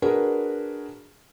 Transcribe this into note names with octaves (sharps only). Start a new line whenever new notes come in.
D4 F#4 G#4 A#4 B4